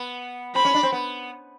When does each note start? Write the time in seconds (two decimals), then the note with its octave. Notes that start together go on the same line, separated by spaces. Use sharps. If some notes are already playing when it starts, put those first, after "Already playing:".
Already playing: B3
0.55 C4 B5
0.65 C#4
0.74 D4
0.83 C4
0.92 B3